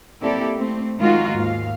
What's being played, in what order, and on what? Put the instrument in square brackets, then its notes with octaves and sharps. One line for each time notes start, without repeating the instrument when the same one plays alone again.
[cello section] A#3 C4 E4 G4 A4 D5
A3 C4
D#3 G#3 D#4 F4 F#4
D#2 G#2 F5